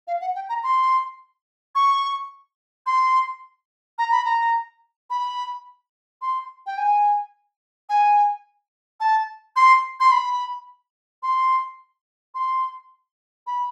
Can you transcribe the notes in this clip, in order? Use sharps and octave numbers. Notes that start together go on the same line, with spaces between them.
F5
F#5
G5
A#5
C6
C#6
C6
A#5
B5
A#5
B5
C6
G5
G#5
G#5
A5
C6
C6
B5
C6
C6
B5